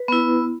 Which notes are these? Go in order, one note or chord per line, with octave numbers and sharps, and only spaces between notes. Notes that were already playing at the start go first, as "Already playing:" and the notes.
Already playing: B4
B3 E4